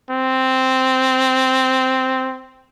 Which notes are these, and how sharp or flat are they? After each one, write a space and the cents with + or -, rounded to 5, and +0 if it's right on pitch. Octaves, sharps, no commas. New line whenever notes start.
C4 -5